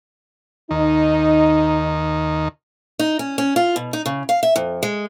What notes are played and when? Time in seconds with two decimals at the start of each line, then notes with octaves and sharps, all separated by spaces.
0.71 D#2 D#3 D#4
2.99 D#4
3.19 C#4
3.38 C#4
3.56 F4
3.76 B2
3.93 D#4
4.06 C#3
4.29 F5
4.43 E5
4.56 F2
4.83 G#3